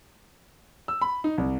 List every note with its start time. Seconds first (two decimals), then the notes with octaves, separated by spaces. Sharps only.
0.88 E6
1.01 B5
1.24 D#4
1.38 C2